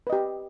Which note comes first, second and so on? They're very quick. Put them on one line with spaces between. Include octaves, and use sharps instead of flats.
B4 D#5 G4